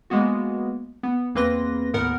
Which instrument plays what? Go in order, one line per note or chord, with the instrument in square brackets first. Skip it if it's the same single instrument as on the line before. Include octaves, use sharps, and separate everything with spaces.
[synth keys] G#3 A#3 B3 F#4
B3
E2 A#3 C4 B4 C6 A#6
D#2 A2 B3 A#4 F#5